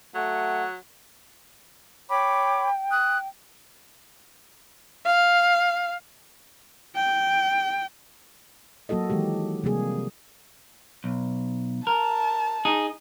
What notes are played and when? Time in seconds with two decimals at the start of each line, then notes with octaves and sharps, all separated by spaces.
0.15 F#3 A3 F#5
2.10 C#5 G5 B5 D6
2.91 D#6 F#6
5.06 F5
6.95 G5
8.89 F#3 A#3 F#4 A4 D#5
9.10 D#3 E3 G#3 G4
9.64 C3 F3 G3 A#3 G#4
11.04 B1
11.87 A#4 A5
12.65 D#4 G#4